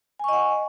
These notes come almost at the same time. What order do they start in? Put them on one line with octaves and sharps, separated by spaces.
G#5 C#6 D#5 F#5